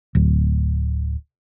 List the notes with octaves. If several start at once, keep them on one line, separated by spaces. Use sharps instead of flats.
D1